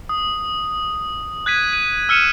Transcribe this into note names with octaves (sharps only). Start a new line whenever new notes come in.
D#6
F#6 G#6 B6 D#7
D#7
E6 F6 C#7 D#7 E7